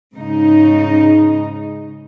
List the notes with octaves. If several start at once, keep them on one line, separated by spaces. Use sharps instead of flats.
G#2 C#3 D#4